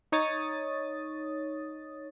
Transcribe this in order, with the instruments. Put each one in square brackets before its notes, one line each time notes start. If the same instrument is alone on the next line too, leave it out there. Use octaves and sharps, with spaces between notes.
[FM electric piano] D#4 C#5 D#6 A6